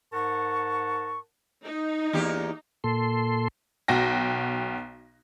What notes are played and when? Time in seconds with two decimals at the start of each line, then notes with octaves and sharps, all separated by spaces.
0.13 G#2 A#4 F#5 A5 C#6
1.65 D#4
2.13 E2 A#3 G4
2.84 A#2 A4 C6
3.88 B1 F#4 G5 A#6